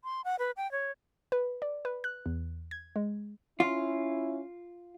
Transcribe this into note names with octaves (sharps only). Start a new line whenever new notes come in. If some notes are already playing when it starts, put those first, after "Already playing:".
C6
F#5
B4
G5
C#5
B4
D5
B4
F#6
E2
G#6
G#3
C#4 E4 F4